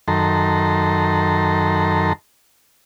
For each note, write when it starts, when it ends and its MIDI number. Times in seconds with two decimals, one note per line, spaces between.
0.08 2.13 42
0.08 2.13 51
0.08 2.13 69
0.08 2.13 82
0.08 2.13 84